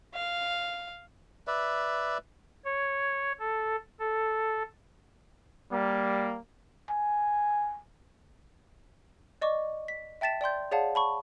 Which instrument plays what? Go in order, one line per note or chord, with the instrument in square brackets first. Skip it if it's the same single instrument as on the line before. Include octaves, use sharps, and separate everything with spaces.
[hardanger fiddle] F5
[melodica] B4 D5 E5
[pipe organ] C#5
A4
A4
[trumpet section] G3 A#3
[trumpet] G#5
[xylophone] D5 D#5 C#6 D6
B6
E5 G5 A5 A6 B6 E7
D5 G5 C6 G6
G#4 C#5 D5 F5 F#5 A5
A5 B5 C#6